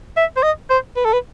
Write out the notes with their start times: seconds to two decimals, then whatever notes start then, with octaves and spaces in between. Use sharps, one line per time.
0.17 E5
0.37 C5
0.43 D#5
0.70 C5
0.96 B4
1.05 A4
1.13 B4